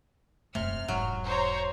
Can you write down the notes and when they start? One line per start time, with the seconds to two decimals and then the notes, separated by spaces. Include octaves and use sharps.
0.55 E1 F#2 C3 A3 F6
0.88 E1 G#2 F#3
1.25 C5 C#5 A#5